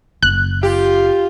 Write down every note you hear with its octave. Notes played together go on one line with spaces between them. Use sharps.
F#1 F#6
F4 G4